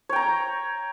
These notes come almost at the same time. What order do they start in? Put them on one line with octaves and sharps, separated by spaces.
C#5 G5 A#5